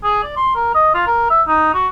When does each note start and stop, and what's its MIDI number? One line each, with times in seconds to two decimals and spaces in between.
0.04 0.23 68
0.23 0.34 74
0.37 0.53 84
0.55 0.73 70
0.74 0.93 75
0.94 1.02 65
1.07 1.25 70
1.30 1.42 76
1.48 1.74 63
1.74 1.88 66